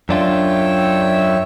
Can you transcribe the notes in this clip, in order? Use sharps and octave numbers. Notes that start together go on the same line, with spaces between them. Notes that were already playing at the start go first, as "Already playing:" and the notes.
F#2 D4 F4 C#5 E5 G5